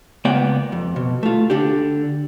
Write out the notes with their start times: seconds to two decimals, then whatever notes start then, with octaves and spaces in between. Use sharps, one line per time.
0.25 C#2 A#3 B3 D5 F#5 G5
0.72 F2
0.96 B2
1.23 A3 F4
1.50 D3 D4 G4